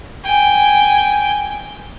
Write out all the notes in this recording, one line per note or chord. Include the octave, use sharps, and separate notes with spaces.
G5 G#5